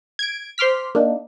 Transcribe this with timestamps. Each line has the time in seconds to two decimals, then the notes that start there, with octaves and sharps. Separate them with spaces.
0.19 G#6 D7
0.58 C5 C6 D6 F6 B6
0.95 A#3 D4 D#4